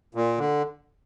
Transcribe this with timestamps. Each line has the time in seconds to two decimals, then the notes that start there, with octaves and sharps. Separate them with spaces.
0.15 A#2
0.38 D3